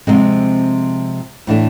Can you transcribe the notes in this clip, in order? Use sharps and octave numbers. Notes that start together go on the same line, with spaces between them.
C3 F3 G#3 C4
A2 E3 A3 D4